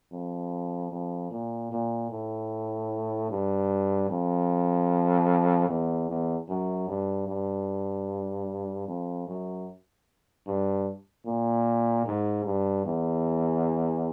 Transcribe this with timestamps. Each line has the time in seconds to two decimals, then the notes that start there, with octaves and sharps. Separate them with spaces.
0.12 F2
0.91 F2
1.31 A#2
1.71 A#2
2.11 A2
3.30 G2
4.10 F2
5.69 E2
6.09 E2
6.49 F#2
6.88 G2
7.28 G2
8.87 F2
9.27 F#2
10.47 G2
11.26 A#2
12.06 G#2
12.45 G2
12.85 E2